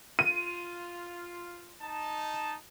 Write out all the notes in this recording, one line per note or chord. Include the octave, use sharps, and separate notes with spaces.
F4 D#7
D#4 A5